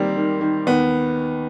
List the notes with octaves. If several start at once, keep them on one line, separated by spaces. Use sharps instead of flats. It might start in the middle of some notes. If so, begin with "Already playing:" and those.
Already playing: D#3 G3 A#3 C4
D#3
D#3
D#2 B3